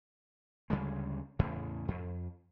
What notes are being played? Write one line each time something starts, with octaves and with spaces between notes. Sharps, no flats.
D2 C#3 G3 G#3
E2 A2 C#3
F2